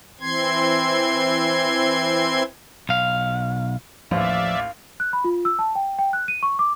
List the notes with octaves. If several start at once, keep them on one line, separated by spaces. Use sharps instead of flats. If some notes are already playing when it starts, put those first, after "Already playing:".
E3 C4 C6 G#6
B1 F5
A1 D#2 F3 D5 E5 F5
F#6
B5
F4
E6
A5
G5
G5
F#6
D#7
C#6
D6